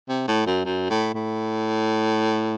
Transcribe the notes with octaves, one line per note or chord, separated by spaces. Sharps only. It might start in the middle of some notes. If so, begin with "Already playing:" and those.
C3
A2
F#2
F#2
A2
A2